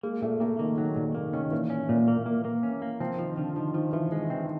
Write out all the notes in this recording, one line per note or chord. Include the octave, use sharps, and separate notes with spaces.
G#3 A#3
A#2 A3
A3 A#3
D#3 A#3
D#3 F#3
A#2 D#3
D#3 A#3
D#3 C#4
A#2 E3
C#4
A#2
A#3
A#3
A#3
C#4
A#3
F3 C4
D#3 F3
D3 F3
D#3 F3
D#3 F3
E3 F3
G#3
D#3 C4